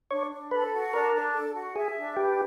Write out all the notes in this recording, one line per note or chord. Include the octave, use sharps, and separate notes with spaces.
D4 C#5
D4
A4 B4
F#4
D4 A#4
D4
A4
F#4
G#4 E5
D4
G4 B4